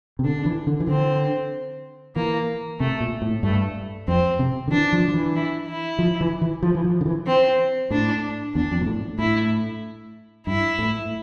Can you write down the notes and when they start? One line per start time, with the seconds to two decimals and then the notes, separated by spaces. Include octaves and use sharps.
0.19 C3
0.24 D3 D4
0.39 D3
0.46 E3
0.67 D3
0.80 E3
0.87 D3 C4
2.16 E3 A#3
2.80 C3 A3
3.00 A#2
3.22 A2
3.43 G2 A3
4.08 F2 C4
4.39 C3
4.68 D3
4.72 E3 D4
4.93 F3
5.08 F3
5.14 E3
5.36 E4
5.68 E4
5.99 F3
6.21 E3
6.41 E3
6.63 F3
6.75 E3
6.84 F3
7.01 D3
7.06 E3
7.26 C4
7.91 A2 D4
8.54 E2 D4
8.71 F2
8.81 A#2
8.86 A2
9.19 A2 E4
10.47 G2 E4
10.79 A2